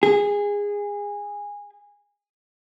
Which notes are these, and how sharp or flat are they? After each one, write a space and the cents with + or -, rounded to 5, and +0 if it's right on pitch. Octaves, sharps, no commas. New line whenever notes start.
G#4 -20